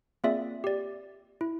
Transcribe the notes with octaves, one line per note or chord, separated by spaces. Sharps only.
A#3 C4 F4 G#4 D5 E5
G4 D5
E4